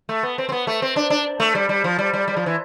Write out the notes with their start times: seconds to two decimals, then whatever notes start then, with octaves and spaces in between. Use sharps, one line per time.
0.09 A3
0.23 B3
0.38 C4
0.49 C4
0.52 B3
0.67 A3
0.82 C4
0.96 D4
1.10 D4
1.40 A3
1.55 G3
1.69 G3
1.84 F3
1.99 G3
2.13 G3
2.28 G3
2.37 F3
2.46 E3